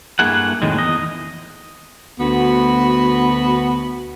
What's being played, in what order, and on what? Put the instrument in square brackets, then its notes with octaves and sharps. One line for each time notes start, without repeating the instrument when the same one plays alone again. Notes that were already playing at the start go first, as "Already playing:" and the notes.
[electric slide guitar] G2 A3 A#3 E4 G#4 F#5
F2 A2 D#3 G#3
E2 D#4 D#5
[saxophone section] D2 B3 F#4